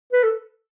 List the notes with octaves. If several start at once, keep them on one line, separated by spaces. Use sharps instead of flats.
B4
A4